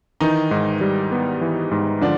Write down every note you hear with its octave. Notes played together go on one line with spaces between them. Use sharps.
D#3 E3 D#4
G#2
G3
B3
E3
G#2
D3 F3 D4